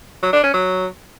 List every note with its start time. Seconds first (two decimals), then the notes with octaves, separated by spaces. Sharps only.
0.23 F#3
0.33 D4
0.43 C#4
0.54 F#3